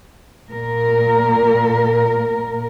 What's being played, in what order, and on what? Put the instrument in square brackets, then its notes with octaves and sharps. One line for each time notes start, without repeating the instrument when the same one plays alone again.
[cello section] A#2 A#4